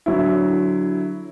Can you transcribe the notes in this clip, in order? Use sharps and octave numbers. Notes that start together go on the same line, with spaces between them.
D3 F#3 E4